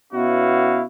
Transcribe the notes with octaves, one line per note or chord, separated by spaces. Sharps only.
B2 B3 C#4 E4 F#4 F5